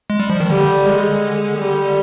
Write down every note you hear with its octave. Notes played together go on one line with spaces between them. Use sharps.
G#3
G3
F3
D#3
D3 G3
G#3
G3